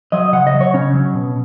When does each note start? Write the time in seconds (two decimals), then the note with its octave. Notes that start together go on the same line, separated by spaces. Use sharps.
0.12 F#3 D#5
0.33 C#3 F#5
0.47 D#5
0.54 F#3
0.61 C#5
0.74 C#3 C#4
0.93 F#3
1.14 B2